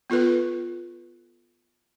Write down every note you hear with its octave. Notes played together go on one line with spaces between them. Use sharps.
B3 F4 A4 B4